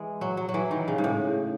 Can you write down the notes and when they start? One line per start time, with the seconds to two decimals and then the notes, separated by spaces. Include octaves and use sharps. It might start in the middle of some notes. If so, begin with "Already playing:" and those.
Already playing: E3 G#3
0.21 F#3
0.37 F#3
0.49 F#3
0.54 E3
0.71 D#3
0.88 C#3
0.98 G#2
1.04 A2